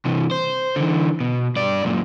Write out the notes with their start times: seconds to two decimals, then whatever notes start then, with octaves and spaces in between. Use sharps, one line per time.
0.05 C3 E3
0.31 C5
0.76 D3 E3
1.20 B2
1.56 G2 D5
1.84 F#2 A#2